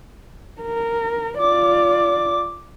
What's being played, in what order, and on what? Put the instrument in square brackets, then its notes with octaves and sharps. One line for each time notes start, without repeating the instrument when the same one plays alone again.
[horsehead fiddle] A#4
[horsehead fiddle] F4 D5 [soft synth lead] D6